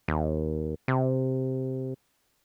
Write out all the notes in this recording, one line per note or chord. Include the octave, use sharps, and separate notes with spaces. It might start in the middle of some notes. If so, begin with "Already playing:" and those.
D#2
C3